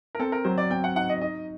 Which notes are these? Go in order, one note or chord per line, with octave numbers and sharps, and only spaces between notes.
A#4
C4 A4
A#4
F#3 C5
D5
C4 G5
F#5
D#4 F#5
D#5
D#4 D#5